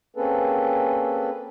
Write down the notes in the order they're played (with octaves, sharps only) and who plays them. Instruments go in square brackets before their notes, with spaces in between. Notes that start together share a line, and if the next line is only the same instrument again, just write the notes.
[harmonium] A#3 C4 C#4 G#4 A4 B4